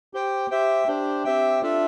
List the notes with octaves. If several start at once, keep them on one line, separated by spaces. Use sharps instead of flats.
G4 C5 G5
G4 C5 E5 G5
D4 G4 C5
C4 G4 C5 E5 G5
D4 F4 A4 E5